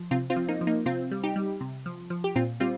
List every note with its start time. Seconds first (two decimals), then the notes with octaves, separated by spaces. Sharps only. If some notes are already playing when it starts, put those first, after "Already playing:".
Already playing: F3
0.11 C3 C4 F4
0.30 C4 F4
0.36 F3
0.48 A#3 D#4
0.61 F3
0.67 A#3 D#4
0.86 C3 C4 F4
1.11 G3
1.23 D#4 G4
1.36 G3
1.61 C3
1.86 F3
2.10 F3
2.24 G4
2.35 A#2 C4 F4
2.60 G3 C4 F4